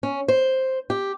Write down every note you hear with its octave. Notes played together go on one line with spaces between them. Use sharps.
C#4
C5
G4